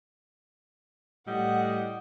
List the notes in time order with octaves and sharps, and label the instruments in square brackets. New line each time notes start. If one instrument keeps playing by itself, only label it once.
[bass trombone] A2 [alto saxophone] G3 [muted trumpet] D#5 [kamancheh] F#5